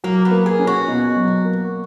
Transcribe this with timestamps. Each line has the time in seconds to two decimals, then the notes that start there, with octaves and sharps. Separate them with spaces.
0.04 F#3 A#3
0.25 B3
0.31 A#3
0.46 G#4
0.59 C#4
0.67 F#4
0.88 B2
1.16 F#3
1.45 A#3